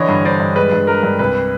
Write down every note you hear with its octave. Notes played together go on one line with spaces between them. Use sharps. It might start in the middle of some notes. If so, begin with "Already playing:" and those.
Already playing: D3 E3 C#5 D#5
G2
D4 C5 D5
G2
G#3 B4
G2
G#3 A#4
G2
C2 B4